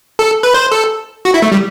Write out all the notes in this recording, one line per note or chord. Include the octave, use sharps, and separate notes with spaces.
A4
B4
C5
A4
F#4
E4
A3
G3